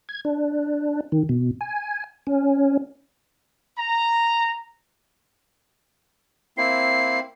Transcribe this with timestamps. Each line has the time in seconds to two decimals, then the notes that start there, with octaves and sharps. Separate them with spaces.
0.09 G#6
0.25 D4
1.12 D#3
1.29 B2
1.61 G#5
2.27 C#4
3.78 A#5
6.58 A#3 C4 E4 C7